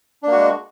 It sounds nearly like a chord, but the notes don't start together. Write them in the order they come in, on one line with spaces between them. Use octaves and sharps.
D4 A#3 F#4 G#3